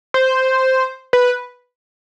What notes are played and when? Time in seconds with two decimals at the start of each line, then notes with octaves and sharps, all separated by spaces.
0.14 C5
1.13 B4